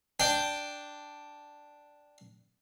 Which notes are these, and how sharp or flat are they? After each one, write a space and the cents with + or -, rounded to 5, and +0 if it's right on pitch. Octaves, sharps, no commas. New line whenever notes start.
D4 +0 G5 +0